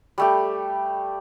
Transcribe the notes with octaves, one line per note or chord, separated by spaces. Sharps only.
G3 A3 G4